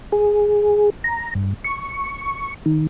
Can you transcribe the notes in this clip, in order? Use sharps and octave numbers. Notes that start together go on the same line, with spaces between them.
G#4
A#5
G2
C#6
D#3